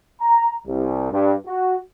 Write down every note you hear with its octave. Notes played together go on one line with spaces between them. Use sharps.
A#5
C2
G2
F#4